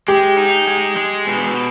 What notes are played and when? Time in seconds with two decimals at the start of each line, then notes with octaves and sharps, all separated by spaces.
0.08 G#3 G4
0.37 D#4
0.68 G#3
0.96 G#3
1.27 B2